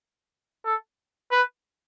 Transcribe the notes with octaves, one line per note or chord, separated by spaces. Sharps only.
A4
B4